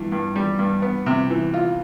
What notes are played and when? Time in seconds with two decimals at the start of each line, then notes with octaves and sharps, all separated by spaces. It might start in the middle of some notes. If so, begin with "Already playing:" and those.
Already playing: G2 E3
0.12 G2
0.35 G3
0.58 G2
0.82 B3
1.06 C3
1.30 E3
1.53 F4